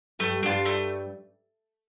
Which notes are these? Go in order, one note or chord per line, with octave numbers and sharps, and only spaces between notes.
G2 G3 A3
G2 G3 D4 F4
A3